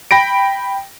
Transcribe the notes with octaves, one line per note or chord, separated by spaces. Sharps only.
G5 B5 A#6 D7